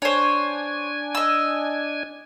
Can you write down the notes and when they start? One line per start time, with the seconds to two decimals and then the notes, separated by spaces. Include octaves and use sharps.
0.02 D4 C5 C#5 G#5
1.15 D#5 E6